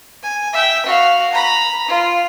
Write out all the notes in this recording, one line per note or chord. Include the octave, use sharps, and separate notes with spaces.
G#5
E5 G5
F#4 F5
A#5 B5
F4